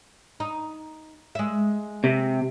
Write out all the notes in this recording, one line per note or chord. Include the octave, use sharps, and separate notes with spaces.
D#4
G#3 E5
C3